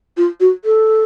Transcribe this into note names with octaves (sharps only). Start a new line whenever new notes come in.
F4
F#4
A4